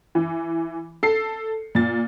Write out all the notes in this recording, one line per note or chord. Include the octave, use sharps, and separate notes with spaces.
E3
A4 C7
A#2 A6